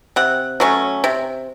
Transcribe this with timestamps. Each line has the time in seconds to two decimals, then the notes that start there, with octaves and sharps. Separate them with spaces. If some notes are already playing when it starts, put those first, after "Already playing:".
0.16 C3 F#5
0.60 F#3 A3 C#4
1.04 C3